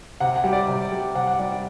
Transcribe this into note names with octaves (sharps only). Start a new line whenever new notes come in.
C3 F#5
F#5
G3
D5
C3
G3
C3 F#5
F#5
G3 D5
D5